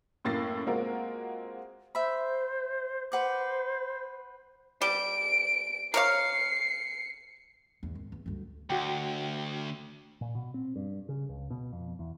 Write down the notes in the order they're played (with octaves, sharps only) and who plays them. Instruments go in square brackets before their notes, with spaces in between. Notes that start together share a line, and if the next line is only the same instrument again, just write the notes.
[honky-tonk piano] F#2 A2 A#3 A6 A#6 C7
G#3 A#3 C4 F4 F#4 A#4
[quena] C5 [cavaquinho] E5 B5
[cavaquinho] B4 F#5 D6 [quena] C5
[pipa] G3 [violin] D7
[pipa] A#4 C#5 F5 [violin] C7 C#7
[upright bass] E2 G#2
G#1
E2
D2 G2
[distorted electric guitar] D2 [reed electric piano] F#4 G5
[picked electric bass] A#2
B2
C4
G2
C#3
C#2
B2
F2
E2